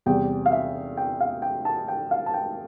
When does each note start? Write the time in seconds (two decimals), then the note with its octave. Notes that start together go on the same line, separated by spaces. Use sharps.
0.06 E2 C3 G3 G5
0.46 F5
0.52 E5
0.97 G5
1.20 F5
1.42 G5
1.65 A5
1.88 G5
2.11 F5
2.26 A5
2.34 G5